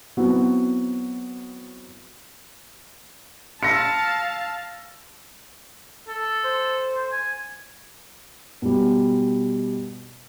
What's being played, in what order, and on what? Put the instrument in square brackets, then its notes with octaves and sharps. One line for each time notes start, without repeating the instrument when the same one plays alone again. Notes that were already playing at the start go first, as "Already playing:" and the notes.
[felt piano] F#3 B3 C4 E4 F#4
[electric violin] F5 A5 [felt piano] E6 A#6 C#7
[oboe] A4
[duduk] C5
[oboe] G#5
[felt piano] B2 G3